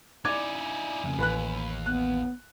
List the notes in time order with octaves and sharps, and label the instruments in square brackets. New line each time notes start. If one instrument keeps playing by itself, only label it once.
[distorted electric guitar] D#4 E4 [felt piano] D5 D6 G#6 [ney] G#5
[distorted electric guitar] F2 C#3
[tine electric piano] A1 [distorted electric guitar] D#2 [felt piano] B4 B5 F#6
[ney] B3 [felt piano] F#6